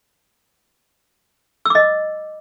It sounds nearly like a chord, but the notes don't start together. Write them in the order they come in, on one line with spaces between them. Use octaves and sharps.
E6 D6 D#5